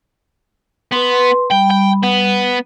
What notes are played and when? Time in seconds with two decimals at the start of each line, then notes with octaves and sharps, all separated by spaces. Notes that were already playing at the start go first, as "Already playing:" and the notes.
0.92 B3 B4 C6
1.51 G3 G5 B5
1.71 G5
2.03 B3